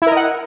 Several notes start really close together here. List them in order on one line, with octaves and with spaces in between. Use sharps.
E4 A#4 D#5 F#5